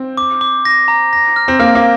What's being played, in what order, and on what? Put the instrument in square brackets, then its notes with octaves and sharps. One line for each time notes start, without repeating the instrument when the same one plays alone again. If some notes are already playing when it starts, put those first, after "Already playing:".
Already playing: [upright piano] C4
[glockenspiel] D6
D6
A#6
A#5
A#6
F6
[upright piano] C4
[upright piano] A#3 [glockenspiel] F6
[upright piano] A#3